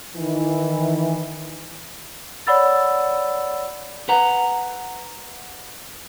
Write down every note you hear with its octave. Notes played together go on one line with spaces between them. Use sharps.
D#3 E3
C#5 D5 F#5 B5 E6 A6
B4 F#5 A#5